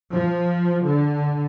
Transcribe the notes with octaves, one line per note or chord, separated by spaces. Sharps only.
F3
D3